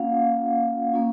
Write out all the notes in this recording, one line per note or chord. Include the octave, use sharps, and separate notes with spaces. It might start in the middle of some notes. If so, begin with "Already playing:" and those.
Already playing: A#3 C#4 F4 F5 F#5
A#3 C#4 F4